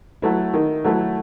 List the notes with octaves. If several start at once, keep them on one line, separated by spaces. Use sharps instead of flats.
F#3 A3 E4
D#3
F#3 A3 E4